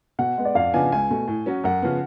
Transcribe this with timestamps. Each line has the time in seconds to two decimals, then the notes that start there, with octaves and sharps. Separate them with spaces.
0.19 B2 F#5
0.37 G#3 B3
0.45 D5
0.55 F2 F5
0.73 C#3 F3 B3 D4 G#5
0.92 C#2 G#5
1.10 B2 A3
1.28 A2
1.46 F#3 C#4 F#4
1.64 F#2 F#5
1.82 C#3 F3 B3